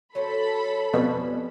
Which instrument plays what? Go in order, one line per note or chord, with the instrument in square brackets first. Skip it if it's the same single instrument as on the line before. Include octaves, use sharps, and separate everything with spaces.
[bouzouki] F#3 C#4 C5 [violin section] A4 B5
[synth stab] F2 B2 [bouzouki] G3 G#5